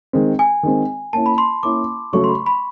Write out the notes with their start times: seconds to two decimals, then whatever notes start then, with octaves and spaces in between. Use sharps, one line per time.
0.13 D#3 G#3 C4
0.39 G#5
0.63 D#3 G#3 C4
1.13 A#3 C#4 E4 A5
1.26 B5
1.38 C6
1.63 A#3 C#4 E4 D6
2.12 C#3 F#3 A3 C#4 C#6
2.24 C6
2.29 B5
2.46 B5